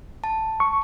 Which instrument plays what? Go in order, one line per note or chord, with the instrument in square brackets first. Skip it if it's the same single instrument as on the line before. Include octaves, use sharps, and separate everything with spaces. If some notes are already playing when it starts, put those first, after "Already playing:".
[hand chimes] A5
[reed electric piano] C#6